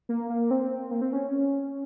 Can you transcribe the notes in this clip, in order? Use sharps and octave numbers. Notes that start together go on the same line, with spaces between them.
A#3
A#3
C4
A#3
C4
C#4